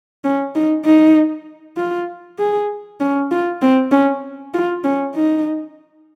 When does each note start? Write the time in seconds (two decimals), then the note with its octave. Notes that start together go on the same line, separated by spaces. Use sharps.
0.24 C#4
0.55 D#4
0.85 D#4
1.77 F4
2.39 G#4
3.00 C#4
3.31 F4
3.62 C4
3.92 C#4
4.54 F4
4.84 C#4
5.15 D#4